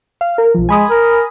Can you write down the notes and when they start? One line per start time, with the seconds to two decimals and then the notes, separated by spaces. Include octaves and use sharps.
0.21 F5
0.38 A#4
0.54 B1 F3
0.69 G#3 G#5 B5 D#6
0.90 A#4